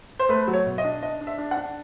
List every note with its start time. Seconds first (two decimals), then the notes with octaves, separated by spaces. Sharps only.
0.19 C5
0.29 A3 B4
0.47 F#3
0.53 C#5
0.66 B2
0.78 D#5
0.84 D4
1.02 D4 D#5
1.21 D4
1.27 E5
1.38 D4
1.51 F#5
1.57 D4